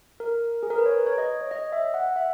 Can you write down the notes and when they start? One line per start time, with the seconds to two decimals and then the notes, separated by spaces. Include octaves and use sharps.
0.20 A#4
0.63 G#4
0.70 A#4
0.78 B4
0.86 C#5
1.06 C#5
1.18 D#5
1.41 C#5
1.51 D#5
1.72 E5
1.94 F#5
2.16 E5